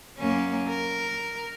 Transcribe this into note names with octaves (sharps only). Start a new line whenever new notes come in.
F#2 A#3 C#4
A#4